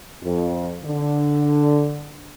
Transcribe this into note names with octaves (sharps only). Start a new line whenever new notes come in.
F2
D3